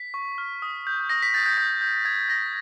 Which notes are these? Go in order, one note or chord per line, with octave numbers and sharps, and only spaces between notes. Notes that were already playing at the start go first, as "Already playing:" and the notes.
Already playing: B6
C#6
F6
D#6
G6
D#6 A#6
B6
G6 A6
G6
D#6 G6
G6
D#6 G#6
G6 A#6